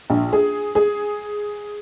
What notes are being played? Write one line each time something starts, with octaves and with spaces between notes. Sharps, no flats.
A#1
G#4
G#4